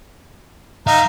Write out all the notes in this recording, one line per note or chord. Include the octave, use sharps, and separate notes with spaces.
D#4 E5 F5 A#5